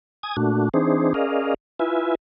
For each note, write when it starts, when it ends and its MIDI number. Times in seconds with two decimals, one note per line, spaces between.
0.23 0.36 80
0.23 0.36 87
0.23 0.36 92
0.37 0.69 46
0.37 0.69 57
0.37 0.69 62
0.37 0.69 66
0.74 1.13 52
0.74 1.13 60
0.74 1.13 62
0.74 1.13 63
0.74 1.13 68
0.74 1.13 72
1.14 1.54 61
1.14 1.54 68
1.14 1.54 70
1.14 1.54 74
1.14 1.54 75
1.14 1.54 77
1.79 2.15 64
1.79 2.15 65
1.79 2.15 71
1.79 2.15 76
1.79 2.15 80